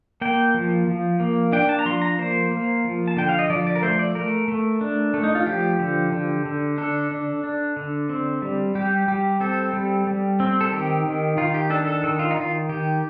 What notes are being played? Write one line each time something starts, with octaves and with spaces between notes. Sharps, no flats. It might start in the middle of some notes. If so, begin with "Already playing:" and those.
A#3 G5
F3
F3
A#3
D4 G5
A5
A#5
F3 C6
A#5
A#3 C5
A#3
F3
A5
D3 G5
F5
D#5
F3 D5
D5
A#4
A3 C5
D5
A3 A#4
A3
D4
A3
D#4
F4
F3 G4
D3
D3
D3
D4 A4
D4
D4
D3
C4
G3
G3 G4
G3 G4
C4 A4
G3
G3
C4
A4
D#3 G4
D#3
D#3 F4
G4
D4 A4
A4
D#3 A4
F4
D#4
D#3 F4
D#3 G4